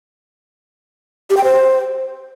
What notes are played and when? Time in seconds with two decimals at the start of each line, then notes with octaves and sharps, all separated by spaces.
1.30 G4
1.37 G5
1.44 C5